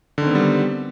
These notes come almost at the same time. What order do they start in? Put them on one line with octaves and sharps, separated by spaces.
D3 D#3 C4 B3 G3